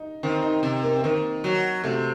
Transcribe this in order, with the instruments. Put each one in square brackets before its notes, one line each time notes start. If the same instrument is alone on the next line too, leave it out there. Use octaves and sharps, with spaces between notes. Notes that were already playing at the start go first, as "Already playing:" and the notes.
Already playing: [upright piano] D#4
[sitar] D#3 [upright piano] C4
[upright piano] D#4
[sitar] C3
[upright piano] A#3
C4
[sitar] D#3 [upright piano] A#3
[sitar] F#3
[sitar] C3 [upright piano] A3